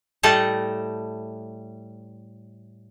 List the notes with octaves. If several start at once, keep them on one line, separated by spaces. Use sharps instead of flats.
A2 G3 A3 A4 D#5 A5